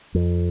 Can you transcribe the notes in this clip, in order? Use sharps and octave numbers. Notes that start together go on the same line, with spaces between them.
F2